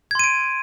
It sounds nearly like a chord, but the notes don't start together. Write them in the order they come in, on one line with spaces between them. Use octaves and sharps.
G#6 C6 D#7 D7